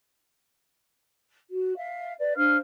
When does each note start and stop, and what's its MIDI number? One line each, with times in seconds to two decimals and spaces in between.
1.50 1.75 66
1.76 2.12 76
1.76 2.12 77
2.18 2.33 71
2.18 2.33 74
2.36 2.56 62
2.36 2.56 72
2.36 2.56 77
2.36 2.56 89